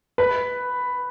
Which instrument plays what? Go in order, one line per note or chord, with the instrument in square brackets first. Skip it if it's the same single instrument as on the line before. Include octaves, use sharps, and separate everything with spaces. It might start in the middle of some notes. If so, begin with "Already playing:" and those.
[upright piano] B4